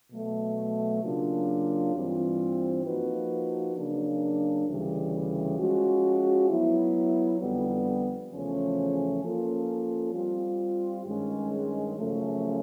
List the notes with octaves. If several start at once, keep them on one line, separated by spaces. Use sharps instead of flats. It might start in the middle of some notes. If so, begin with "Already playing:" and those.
B2 F#3 A3
C#3 F#3 A#3 D4 F4
G2 E3 G3 C4 F4
F3 A#3 D#4 F#4 B4
C#3 F#3 A#3 D4
D2 C#3 E3 G3
F3 G#3 C#4 F#4
F#3 B3 E4
F2 D3 G3 B3
E2 C#3 F3 A3 C#4
F3 A#3 C#4 F4 A4
G3 C4 F4
G2 D#3 G#3 C#4
F#2 C#3 F3 A3 C#4